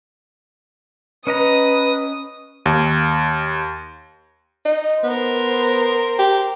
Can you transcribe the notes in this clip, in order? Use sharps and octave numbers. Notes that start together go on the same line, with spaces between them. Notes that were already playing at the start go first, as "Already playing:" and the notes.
C#4 B4 D#5 A#5 D#6
D#2
D#4
B3 A#4 C5
G4